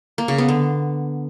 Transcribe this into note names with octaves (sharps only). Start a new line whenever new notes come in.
A#3
C#3
B3
D3